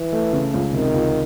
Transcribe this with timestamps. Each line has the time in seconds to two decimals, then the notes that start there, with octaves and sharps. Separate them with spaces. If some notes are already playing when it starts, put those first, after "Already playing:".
Already playing: E3
0.13 A3
0.33 C#3
0.54 C#2
0.73 C3 D#3
0.94 C#2